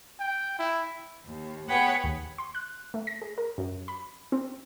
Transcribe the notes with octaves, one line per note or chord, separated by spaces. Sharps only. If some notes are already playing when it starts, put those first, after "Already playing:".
G5
E4
D#2
B3 G#4 B4 C#5 F#5 G5
D#2
C6
F#6
A3
A#6
G#4
A#4
F#2
B5
C4